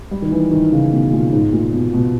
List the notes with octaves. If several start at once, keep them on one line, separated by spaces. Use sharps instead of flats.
G3
D#3
E3
D#3
C#3
B2
A#2
G#2
A#2
B2
B2